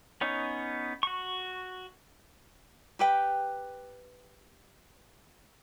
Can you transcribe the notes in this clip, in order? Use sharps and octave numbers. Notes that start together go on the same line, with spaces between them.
B3 C#4 D#4 C#5
F#4 C#6
G4 B4 G5